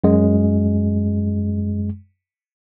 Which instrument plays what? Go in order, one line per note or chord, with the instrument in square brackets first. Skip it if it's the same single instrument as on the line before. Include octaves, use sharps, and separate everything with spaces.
[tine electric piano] F#2 G#3